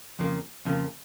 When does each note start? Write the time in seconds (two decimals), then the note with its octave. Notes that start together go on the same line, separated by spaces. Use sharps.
0.19 F2 C#3 F3 A#3
0.65 F2 C#3 F3 A#3